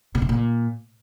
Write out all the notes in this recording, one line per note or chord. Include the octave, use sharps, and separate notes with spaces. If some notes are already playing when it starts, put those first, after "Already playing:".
B2
C3
A#2